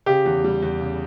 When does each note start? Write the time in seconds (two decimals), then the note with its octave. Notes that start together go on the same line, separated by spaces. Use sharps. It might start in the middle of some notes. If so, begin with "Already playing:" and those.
0.06 C#3 G4
0.26 E2
0.44 G3
0.62 E2
0.80 C#3